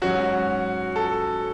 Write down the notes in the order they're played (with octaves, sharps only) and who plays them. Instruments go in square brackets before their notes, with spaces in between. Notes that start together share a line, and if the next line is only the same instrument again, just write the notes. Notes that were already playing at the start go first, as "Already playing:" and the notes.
[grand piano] G#2 F#3 C#4 F#4
A4